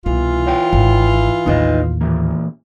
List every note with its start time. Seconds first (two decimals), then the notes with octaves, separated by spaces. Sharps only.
0.06 C2 B2 E3 F4
0.47 C#5 F#5 G5
0.73 G#1
1.46 A1 D#2 D#4 B4 D#5
2.01 A#2 E3 A#3